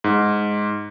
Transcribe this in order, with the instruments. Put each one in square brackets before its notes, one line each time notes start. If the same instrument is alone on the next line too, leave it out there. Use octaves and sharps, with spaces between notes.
[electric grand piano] G#2